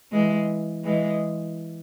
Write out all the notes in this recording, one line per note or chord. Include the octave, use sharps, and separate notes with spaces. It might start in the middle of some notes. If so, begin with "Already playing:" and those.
E3 G#3
E3 G#3